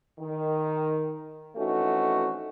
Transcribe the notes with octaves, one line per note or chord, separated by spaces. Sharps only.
D#3
F2 E3 A3 C#4 D#4 F#4